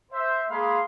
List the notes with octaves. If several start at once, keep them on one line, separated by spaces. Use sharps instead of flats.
C5 E5
G#3 A#3 G#4 F5 B5 C6